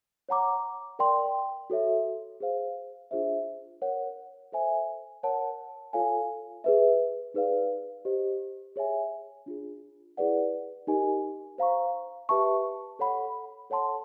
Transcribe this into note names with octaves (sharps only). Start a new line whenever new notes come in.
C#5 F#5 A#5 D6
A#4 D5 G5 C6
F#4 A4 C#5 E5
G#4 C5 F5
D4 F4 G#4 C5 E5
A#4 C#5 F#5
A4 C5 E5 G#5
A#4 C#5 F#5 A5
F4 A4 C#5 F5 G#5
G#4 B4 E5
D#4 G#4 B4 D5 F5
G4 C5 D#5
G#4 C#5 E5 G#5
D4 F4 G#4
E4 G#4 B4 D5 F#5
D#4 G4 A#4 D#5 G#5
C5 F5 A#5 C#6
G4 B4 E5 A5 C#6
A4 C#5 F#5 B5
A4 C#5 F#5 A5 C6